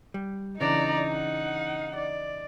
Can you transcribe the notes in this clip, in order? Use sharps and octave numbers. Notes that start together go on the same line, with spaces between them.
G3
C#3 E3 D4 D#4 D5 A#5
F#5
D5